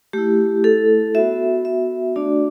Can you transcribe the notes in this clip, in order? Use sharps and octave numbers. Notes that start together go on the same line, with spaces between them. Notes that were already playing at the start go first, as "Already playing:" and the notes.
A3 E4 G4
A4
B3 F#4 E5
E5
A3 D4 F#4 D5